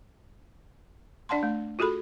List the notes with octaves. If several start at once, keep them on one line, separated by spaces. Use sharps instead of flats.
D4 D5 F#5 A5 C6
A3
F4 F#4 G#4 A4 B5